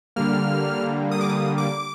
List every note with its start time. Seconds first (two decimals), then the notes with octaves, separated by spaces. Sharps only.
0.16 D3 G3 A#3 F6
1.11 D#6
1.21 D6
1.29 D#6
1.58 D6